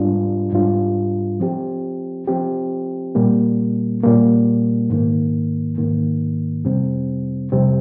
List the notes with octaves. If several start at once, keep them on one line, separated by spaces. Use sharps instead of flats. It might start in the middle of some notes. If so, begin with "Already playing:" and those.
Already playing: G#2 G3 D4 F4
G#2 G3 D4 F4
F3 C4 G4
F3 C4 G4
A#2 G3 A#3
A#2 G3 A#3
G#2 D#3 A#3
G#2 D#3 A#3
F2 C3 G3 C4
F2 C3 G3 C4